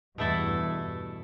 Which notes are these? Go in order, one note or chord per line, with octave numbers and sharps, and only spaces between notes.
E2 G2 B2 A3 E4 A4